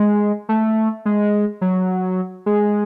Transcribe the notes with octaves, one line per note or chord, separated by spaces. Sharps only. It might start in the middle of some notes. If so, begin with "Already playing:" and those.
Already playing: G#3
A3
G#3
F#3
G#3